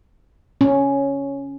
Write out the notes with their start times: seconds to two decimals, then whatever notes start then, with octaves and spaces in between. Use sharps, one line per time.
0.61 C#4